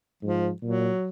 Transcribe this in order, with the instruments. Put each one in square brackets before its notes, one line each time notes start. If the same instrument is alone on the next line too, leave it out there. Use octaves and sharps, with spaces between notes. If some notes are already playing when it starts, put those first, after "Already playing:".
[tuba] G#2 [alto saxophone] F3
[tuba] A#2 [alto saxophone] F#3